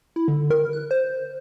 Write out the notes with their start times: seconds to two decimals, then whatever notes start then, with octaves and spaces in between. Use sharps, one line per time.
0.16 E4
0.28 D3
0.50 A#4
0.73 F#6
0.91 C5